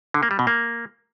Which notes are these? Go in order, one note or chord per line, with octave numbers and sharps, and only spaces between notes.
D3
A#3
G3
B2
A#3